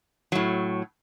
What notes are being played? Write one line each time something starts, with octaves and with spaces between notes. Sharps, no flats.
A2 F#3